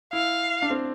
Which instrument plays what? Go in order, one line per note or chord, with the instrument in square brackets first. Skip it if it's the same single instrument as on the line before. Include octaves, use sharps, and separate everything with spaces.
[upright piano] E4 [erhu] F5
[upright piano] D4
C4